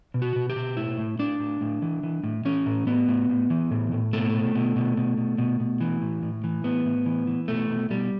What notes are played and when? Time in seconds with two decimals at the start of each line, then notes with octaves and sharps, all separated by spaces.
0.14 B2
0.22 F#4
0.36 B2
0.50 G4
0.56 B2
0.77 A2 E4
0.98 A2
1.19 A2 D4
1.40 A2
1.61 A2
1.82 E3
2.03 E3
2.24 A2
2.45 E3 C#4
2.66 A2
2.87 A2 B3
3.09 A2
3.30 A2
3.50 E3
3.71 A2
3.92 A2
4.13 B2 A3
4.33 B2
4.55 B2
4.76 B2
4.97 B2
5.18 B2
5.38 B2
5.60 B2
5.81 E3
6.02 A2
6.23 A2
6.44 E3
6.64 A2 B3
6.86 A2
7.06 E3
7.27 E3
7.48 B2 A3
7.69 B2
7.90 B2 G3